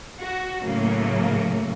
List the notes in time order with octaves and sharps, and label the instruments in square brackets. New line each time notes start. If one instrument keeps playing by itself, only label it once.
[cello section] F#4
A2 C#3 F#3 A3 A#3